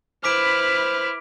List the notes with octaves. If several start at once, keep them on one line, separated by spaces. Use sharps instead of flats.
E4 B4 C5 D6 F6 B6 D7